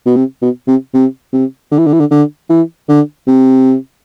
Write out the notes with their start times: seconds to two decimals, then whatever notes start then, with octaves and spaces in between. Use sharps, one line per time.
0.06 B2
0.16 C3
0.42 B2
0.67 C3
0.94 C3
1.33 C3
1.71 D3
1.79 E3
1.86 D3
1.93 E3
2.00 D3
2.11 D3
2.49 E3
2.89 D3
3.27 C3